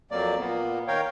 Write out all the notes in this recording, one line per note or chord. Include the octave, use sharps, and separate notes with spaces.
F2 F#3 A#3 D5
A#2 A#3 B3
D#3 A#4 C#5 F5 G5